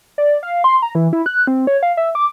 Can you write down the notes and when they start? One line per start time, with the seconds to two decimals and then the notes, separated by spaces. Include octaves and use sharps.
0.18 D5
0.43 F5
0.64 C6
0.82 A#5
0.95 E3
1.13 E4
1.26 F#6
1.47 C4
1.67 C#5
1.83 F5
1.97 E5
2.15 D6